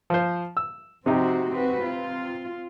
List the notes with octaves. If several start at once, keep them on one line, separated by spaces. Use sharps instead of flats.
F3 C5
E6
C3 F3 C4 D#4 F#4 G4
C4 F#4 B4
C4 F4